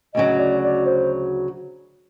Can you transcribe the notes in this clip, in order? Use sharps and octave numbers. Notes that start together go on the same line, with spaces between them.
D2 C#3 F#3 D#5
D5
D5
C5